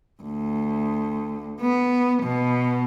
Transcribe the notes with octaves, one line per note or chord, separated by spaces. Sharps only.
D2
B3
B2